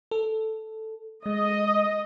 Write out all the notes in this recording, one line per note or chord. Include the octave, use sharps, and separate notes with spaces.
A4
G#3 D#5